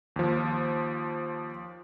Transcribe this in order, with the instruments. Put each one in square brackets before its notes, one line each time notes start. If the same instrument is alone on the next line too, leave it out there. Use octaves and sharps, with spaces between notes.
[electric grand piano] D#2 F3